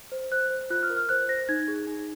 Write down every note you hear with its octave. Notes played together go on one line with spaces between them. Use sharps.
C5
C5 F#6
C5
F4 F#6
F6
A#4
F6
C5 F#6
C5 A#6
D#4 G#6
G#4
D#4